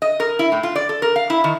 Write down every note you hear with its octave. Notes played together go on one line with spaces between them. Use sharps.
D#5
A#4
E4
A2
F4
D5
A4
A#4
F5
E4
D#3